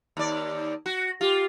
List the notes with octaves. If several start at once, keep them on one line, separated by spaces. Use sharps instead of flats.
D#2 D5
F#4
F4 G4